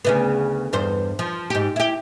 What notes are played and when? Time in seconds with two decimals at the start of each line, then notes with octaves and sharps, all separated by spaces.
0.05 D2 C#3 B3
0.73 E2 G2 C5
1.19 F3
1.50 G#2 G4
1.76 E4 G4